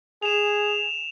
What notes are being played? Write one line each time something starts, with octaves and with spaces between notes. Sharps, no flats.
G#4 E7 F7